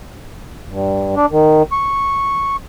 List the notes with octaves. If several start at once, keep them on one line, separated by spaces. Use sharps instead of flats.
G2
D4
D#3
C#6